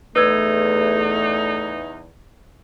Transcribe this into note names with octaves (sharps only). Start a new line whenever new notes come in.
E2 A3 D#4 B4 E6 G#6